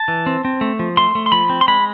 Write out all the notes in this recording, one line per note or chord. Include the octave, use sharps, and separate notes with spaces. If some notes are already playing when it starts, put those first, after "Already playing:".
Already playing: A5
E3
C4
C4
A3
F3
A3 C6
A3
C6
F3 B5
C4
C6
G#3 B5